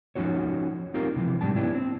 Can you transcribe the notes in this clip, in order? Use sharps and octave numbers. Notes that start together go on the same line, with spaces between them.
F3 C#4 D#4 F#4 C#5
C4 D#4 F4 G4 A#4
C3 E3 F3
G#2 G3 D4 A5
B3 C#4 D4 E4 G4
C4